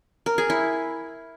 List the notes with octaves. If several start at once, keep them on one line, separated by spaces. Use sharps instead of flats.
A#4
G#4
E4